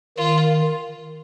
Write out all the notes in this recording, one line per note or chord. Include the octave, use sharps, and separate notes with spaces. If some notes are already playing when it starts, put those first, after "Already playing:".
D#3 F4